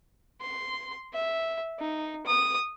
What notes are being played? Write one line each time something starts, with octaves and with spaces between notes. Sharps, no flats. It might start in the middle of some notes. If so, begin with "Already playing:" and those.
C6
E5
D#4
D#6